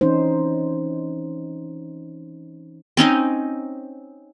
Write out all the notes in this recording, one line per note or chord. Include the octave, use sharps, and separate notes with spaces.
E3 C4 C#4 D#4 C5
C4 C#4 D#4 D#5